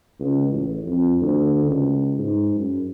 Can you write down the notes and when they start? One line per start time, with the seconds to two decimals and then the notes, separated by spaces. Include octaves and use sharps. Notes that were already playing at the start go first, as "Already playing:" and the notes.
0.20 C#2
0.49 A1
0.86 F2
1.21 D2
1.66 C#2
2.19 G#2
2.55 F#2